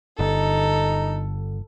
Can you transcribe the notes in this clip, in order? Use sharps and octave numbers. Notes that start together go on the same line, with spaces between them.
G1 D3 D#4 A4